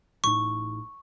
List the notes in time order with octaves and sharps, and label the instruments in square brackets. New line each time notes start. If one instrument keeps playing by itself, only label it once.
[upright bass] A1 D#4 [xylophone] C#6